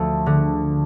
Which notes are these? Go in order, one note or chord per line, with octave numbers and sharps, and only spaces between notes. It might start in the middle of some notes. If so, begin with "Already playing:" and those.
Already playing: D2 F3 A3
D3